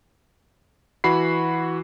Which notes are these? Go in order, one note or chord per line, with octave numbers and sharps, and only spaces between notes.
E3 F#4 B5 C7